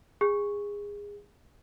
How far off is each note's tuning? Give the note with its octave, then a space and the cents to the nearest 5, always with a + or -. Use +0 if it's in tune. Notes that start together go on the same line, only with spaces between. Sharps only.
G#4 -20